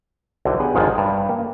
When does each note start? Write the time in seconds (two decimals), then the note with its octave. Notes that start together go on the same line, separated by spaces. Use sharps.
0.45 B1 D3 E4 F#4 D#5 G5
0.60 B3 D4 G4 G#4 F#5 G5
0.75 G#1 F2 G#2 F3 G#3 F4
0.95 G2 G5
1.29 A#3